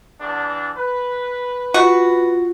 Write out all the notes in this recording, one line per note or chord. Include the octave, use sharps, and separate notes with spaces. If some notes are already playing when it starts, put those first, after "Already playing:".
E2 D4
B4
F4 F#4